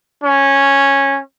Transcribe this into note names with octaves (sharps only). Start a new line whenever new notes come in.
C#4